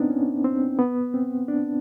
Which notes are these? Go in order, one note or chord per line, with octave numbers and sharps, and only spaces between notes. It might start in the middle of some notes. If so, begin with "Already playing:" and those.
Already playing: B3 C4 D4 D#4
C#4
C4
B3
C4
D4